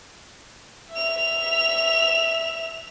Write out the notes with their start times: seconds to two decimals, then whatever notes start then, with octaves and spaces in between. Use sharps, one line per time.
0.91 E5 F7